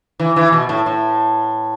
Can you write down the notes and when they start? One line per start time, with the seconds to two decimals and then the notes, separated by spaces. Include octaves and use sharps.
0.20 E3
0.36 E3
0.53 B2
0.69 A2
0.86 A2